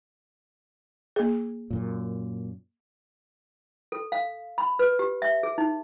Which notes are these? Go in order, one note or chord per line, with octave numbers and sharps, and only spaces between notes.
A#3 G#4
F#2 A#2
A4
F5
B5
B4
G4
E5
G#4
D#4